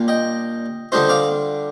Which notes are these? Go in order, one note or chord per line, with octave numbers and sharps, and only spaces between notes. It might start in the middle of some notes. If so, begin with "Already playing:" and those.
Already playing: A#2 G3 D4 F4
D#5 G5
D3 G3 D4 F4 C5 D#5
D5 F5